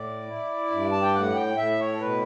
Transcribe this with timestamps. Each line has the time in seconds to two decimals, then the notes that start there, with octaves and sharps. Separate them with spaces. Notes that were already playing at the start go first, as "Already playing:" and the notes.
Already playing: A2 D5
0.27 E4
0.71 G2
0.92 A5
1.02 G5
1.14 A2 F#5
1.35 G5
1.57 A2 E5
1.80 C#5
1.93 A4
2.00 B2 B4